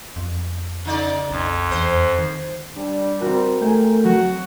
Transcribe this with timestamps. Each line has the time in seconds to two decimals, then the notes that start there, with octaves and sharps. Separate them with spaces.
0.16 F2
0.85 C#3 D#4 D5
1.31 B1 F2
1.71 E2 C5
2.18 D#3
2.77 G3 D4
3.22 C4 F#4 A#4
3.62 A3 G#4 G5
4.04 F#3 F#4